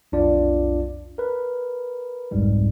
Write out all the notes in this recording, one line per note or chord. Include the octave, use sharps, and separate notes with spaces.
B1 F2 D4 F4 D5
A#4 B4
G1 C2 F2 G#2 G3 G#3